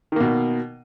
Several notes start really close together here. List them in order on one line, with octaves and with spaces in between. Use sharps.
D#3 A#3 B2